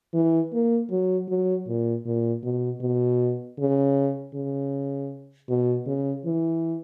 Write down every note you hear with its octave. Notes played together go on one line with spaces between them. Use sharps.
E3
A#3
F#3
F#3
A#2
A#2
B2
B2
C#3
C#3
B2
C#3
E3